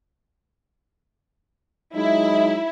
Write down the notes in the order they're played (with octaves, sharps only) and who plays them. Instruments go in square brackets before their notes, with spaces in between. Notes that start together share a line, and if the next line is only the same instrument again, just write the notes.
[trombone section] F#3 G#3 D#4 [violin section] E4